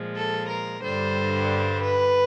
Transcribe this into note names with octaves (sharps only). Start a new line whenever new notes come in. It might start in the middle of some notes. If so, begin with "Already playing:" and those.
Already playing: A#2 F3 G#3
A4
A#4
G2 D3 G3 C5
B4